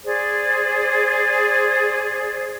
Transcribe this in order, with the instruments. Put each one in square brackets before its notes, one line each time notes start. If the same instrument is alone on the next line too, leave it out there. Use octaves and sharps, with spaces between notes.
[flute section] G#4 C5 D5